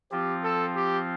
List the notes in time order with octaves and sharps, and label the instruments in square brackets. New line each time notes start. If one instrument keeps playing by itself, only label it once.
[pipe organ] F3 C4 F4 [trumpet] G4
[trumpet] A4
G4